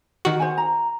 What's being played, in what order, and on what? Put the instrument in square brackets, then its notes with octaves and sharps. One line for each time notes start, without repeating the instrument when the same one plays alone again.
[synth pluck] D#3 F#4
[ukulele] C5 F#5 G#5
A#5